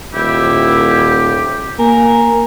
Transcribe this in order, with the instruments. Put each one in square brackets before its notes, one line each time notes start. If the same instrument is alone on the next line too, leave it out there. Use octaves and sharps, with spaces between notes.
[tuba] D#1 [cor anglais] E4 [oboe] G4
[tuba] A#3 [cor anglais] A#4 [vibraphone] G#5